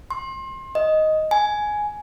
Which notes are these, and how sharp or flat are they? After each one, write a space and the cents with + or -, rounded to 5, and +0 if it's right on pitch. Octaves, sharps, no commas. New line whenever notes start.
C6 +30
D#5 +5
G#5 +10